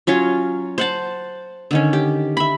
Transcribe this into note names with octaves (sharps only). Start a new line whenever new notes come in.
F#3 C#4 F4 C#5
C5 F#5 A5
D3 D#3 C#4
G4
E5 B5